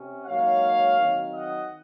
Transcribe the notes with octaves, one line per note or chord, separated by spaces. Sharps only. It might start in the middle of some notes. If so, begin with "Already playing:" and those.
Already playing: C3 C#4
G#2 F#3 A#3 D#4 C#5 F5
D#3 F#3 C4 D#4
D#5 F#5